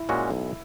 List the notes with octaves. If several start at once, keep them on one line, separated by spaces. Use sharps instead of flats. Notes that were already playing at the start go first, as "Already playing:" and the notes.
Already playing: E4
A#2 G#3 C#4 F#4
B1